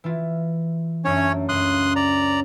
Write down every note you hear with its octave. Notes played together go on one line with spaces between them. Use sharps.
E3 E4 F4
F#2 A3 C#4 D4 C#5
C#2 F#2 C6 D#6 F#6
D5 A#5